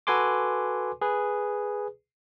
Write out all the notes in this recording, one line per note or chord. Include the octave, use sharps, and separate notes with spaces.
F#4 A4 B4 G#5 C6 D6
G#4 B4